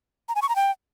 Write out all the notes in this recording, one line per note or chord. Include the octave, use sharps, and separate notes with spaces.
A#5
G#5
C#6
A#5
G5